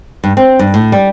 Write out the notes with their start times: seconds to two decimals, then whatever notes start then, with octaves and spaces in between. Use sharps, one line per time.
0.24 G2
0.37 C4
0.59 G2
0.74 A2
0.92 G3